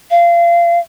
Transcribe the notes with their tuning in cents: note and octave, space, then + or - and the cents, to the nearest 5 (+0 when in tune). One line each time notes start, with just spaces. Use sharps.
F5 -30